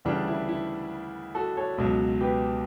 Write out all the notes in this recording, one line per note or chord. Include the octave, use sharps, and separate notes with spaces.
D2 C#3 E3 G3 D4
E4
E4
F#4 A4
A4 C#5
C#2 B2 F#3
G4 B4